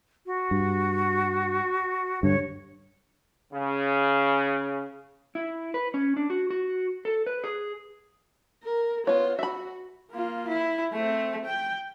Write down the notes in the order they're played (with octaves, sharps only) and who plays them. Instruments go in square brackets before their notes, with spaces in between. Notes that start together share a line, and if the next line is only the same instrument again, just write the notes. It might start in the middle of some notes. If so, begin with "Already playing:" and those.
[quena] F#4
[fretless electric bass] G2
[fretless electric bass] G2 D3 [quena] C#5
[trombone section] C#3
[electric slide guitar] E4
B4
C#4
D4
F#4
F#4
A4
B4
G#4
[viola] A#4
[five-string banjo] B3 C#5 [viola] F4
[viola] F#4 [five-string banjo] E5 B5
[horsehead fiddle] A#3 F4
E4
A3 C4
G5